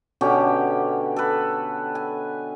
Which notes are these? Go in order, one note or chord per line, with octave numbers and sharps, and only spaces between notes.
B2 D3 C#4 G4
A4 B4
G#5